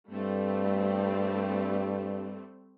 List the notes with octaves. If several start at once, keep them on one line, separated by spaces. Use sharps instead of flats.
G2 G3 A3 C4